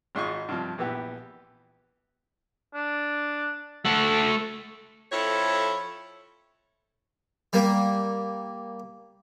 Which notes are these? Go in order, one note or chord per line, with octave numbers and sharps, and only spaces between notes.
G#1 G#2 D#4 F4 C#6
G2 C3 F3
A#1 E3 B3 G4
D4
A3 A4 F#5
F2 E4 A4 C#5
G3 A#3